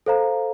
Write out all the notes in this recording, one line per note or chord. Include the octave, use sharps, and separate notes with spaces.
A4 C5 F5 A#5